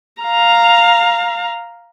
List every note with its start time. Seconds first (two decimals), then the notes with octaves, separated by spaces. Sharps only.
0.22 F5 A#5